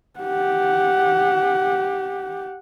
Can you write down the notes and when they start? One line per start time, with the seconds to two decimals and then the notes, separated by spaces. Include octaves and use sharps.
0.20 G4 F#5